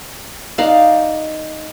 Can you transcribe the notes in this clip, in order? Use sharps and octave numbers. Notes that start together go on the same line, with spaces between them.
D#4 D5 F5